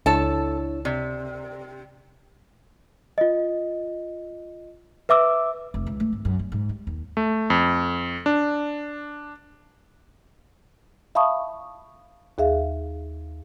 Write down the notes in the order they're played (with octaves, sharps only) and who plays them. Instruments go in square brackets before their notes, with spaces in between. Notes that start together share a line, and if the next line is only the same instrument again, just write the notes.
[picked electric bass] C#2 [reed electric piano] D4 E4 C#5 [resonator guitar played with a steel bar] A4 A5
[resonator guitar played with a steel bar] C3 [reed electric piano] D5
[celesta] F4 D#5
B4 E5 D6 E6
[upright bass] F1
C#2
A3
G#1
F#2
G3
G#2
G3
D#2
[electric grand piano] A3
F2
D4
[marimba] E5 F5 A5 B5 C#6 D#6
D#2 G#4 E5 F5